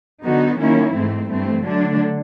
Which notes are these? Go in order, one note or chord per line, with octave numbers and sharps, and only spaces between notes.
D3 F#3 B3 D#4 F#4
D#3 F#3 A#3 C#4 E4
G#2 E3 A3 C4
G2 E3 A3 C4
D3 F#3 A3 D4